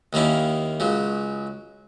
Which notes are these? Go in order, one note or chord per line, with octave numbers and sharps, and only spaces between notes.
D#2 D#3 A#3 C#4 E4
C#2 C#3 F#3